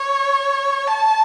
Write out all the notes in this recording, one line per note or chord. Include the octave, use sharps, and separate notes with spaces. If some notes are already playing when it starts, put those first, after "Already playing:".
Already playing: C#5
A5